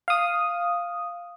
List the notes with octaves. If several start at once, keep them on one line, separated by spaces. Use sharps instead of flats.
F5 D#6